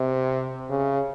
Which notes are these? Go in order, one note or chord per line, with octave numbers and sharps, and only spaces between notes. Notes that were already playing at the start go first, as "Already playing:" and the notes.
Already playing: C3
C#3